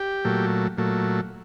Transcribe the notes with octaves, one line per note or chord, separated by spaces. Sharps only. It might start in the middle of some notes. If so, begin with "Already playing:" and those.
Already playing: G4
A#2 F#3 A3
A#2 F#3 A3